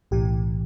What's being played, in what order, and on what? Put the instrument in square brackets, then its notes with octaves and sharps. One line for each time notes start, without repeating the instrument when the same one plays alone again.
[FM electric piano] B1 A2 E3 G4